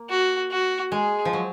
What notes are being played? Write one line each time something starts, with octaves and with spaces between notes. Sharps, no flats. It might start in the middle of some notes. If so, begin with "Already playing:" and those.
Already playing: A#3
F#4
F#4
G#3 G#4
F3
F#3